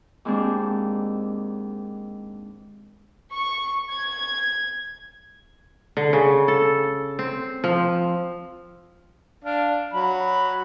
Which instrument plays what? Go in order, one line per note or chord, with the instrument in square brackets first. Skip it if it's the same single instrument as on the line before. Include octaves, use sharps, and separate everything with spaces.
[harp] D#2 G#2 G#3 C4 D4
[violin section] C#6
G#6
[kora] D3
C#3
A4
C4
F3
[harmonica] D4 F5
F#3 B5